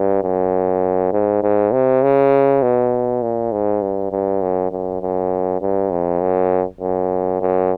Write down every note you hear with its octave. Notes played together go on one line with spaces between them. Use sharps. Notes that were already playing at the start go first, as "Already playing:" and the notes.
Already playing: G2
F#2
G#2
G#2
C3
C#3
B2
A#2
G#2
G2
G2
F#2
F#2
F#2
G2
F2
F#2
F#2
F#2